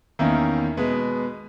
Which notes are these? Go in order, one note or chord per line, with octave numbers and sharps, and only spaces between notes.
E2 D#3 A#3 C#4 E4
B2 G#3 B3